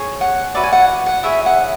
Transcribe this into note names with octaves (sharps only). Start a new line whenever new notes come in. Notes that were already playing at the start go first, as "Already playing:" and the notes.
Already playing: G#4 C#5
F#5
F#4 B4 D5 E5
G#5
F#5
F#5
E4 G#4 C#5 E5
F#5